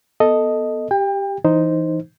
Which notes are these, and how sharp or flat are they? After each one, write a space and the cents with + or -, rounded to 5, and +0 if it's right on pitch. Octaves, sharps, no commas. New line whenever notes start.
B3 +0 A4 +0 D#5 +0
G4 +0 G5 +30
E3 +0 D#4 +0 C5 +0